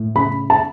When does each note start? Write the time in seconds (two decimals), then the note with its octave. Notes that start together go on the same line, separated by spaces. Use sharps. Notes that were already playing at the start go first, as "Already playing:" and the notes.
Already playing: A2
0.15 C#3 B5
0.50 A5